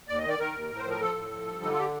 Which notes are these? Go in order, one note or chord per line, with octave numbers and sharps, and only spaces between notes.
D#2 D5
D#5
D#3
D5
D#3 A#4
D#2
A2
C5
F3 A#4
F3 A4
A2
F3
G2
D3 D#4
F4
G4